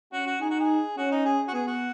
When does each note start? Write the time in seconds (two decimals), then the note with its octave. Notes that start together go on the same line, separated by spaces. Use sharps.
0.13 C#4 F#4
0.27 F#4
0.41 D#4 G#4
0.50 F#4
0.60 G#4
0.97 C#4 F#4
1.11 D#4
1.25 G#4
1.48 F#4
1.53 B3 G#4
1.68 F#4